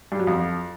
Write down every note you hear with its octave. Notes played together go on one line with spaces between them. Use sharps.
G2
F#3
F2